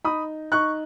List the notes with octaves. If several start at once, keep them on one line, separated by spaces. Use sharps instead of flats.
D#4 B5 D#6
D#4 C#6 F#6